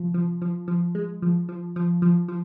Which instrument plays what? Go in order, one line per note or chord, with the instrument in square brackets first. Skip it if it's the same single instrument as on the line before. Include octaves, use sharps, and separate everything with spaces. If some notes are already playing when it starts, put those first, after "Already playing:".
Already playing: [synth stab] C3 F3
F3
F3
F3
G#3
F3
F3
F3
F3
F3